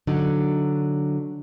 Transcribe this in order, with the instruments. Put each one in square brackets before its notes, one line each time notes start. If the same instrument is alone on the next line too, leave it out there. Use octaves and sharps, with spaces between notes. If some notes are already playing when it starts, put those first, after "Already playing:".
[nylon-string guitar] D3 F#3 D#4